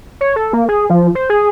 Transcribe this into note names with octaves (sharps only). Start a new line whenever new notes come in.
C#5
A4
A#3
G#4
F3
C5
G#4